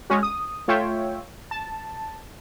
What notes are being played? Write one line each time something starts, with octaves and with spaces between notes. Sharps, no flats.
G#3 C#4 F#4
D#6
A3 F4 C#5 E5 G5
A5